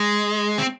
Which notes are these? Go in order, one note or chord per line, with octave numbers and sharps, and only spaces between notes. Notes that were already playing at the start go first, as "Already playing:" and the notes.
Already playing: G#3
C4